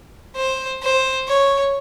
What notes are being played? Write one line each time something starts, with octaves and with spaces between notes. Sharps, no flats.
C5
C5
C#5